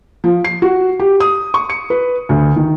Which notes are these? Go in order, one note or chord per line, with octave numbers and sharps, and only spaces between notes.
F3
C7
F#4
G4
D#6
C#6
C#7
B4
D2
D#3